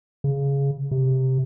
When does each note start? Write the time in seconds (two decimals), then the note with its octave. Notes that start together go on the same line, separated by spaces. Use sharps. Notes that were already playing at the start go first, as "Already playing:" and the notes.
0.24 C#3
0.91 C3